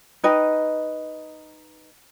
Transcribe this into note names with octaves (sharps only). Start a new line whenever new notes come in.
D#4 B4 D#5 G5